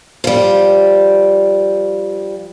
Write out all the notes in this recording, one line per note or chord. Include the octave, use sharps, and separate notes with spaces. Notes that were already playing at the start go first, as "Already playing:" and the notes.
F3 G3